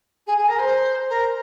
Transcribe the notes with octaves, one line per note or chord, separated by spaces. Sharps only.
G#4
G#4
A#4
C5
A#4